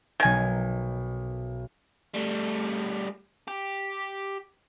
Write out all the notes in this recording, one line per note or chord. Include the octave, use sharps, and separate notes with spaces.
B1 D#3 A#4 G#5
G3 A3
G4